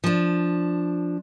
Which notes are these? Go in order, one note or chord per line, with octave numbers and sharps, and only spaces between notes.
F3 D4